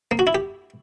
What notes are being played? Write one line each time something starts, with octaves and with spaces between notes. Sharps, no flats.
A#3
F#4
E4
G4